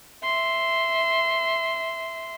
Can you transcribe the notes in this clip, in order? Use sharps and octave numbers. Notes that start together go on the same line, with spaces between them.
E5 C6